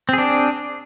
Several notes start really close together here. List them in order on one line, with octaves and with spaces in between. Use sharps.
C4 G#4 D4